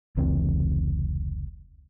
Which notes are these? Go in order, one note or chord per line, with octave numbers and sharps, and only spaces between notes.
F1 C#2 E3 C4